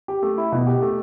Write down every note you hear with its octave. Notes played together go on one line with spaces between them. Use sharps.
G4
A3
E4
B2
G4
A3